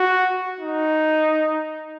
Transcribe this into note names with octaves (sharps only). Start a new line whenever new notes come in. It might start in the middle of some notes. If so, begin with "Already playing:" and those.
Already playing: F#4
D#4